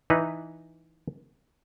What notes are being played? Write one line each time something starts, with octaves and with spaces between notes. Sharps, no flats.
E3 D#4 B4